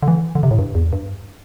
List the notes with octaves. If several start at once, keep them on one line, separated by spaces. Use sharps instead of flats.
D3
E3
D3
C3
A2
G2
E2
G2